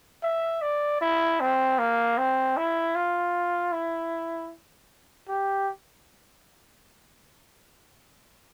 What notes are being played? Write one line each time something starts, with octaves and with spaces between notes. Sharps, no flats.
E5
D5
E4
C4
A#3
C4
E4
F4
E4
G4